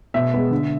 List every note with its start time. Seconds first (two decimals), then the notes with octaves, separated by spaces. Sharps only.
0.14 B2 E5
0.34 G#3 B3
0.51 D3